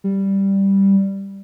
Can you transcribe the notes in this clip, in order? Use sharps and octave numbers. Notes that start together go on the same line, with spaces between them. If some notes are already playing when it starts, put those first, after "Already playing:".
G3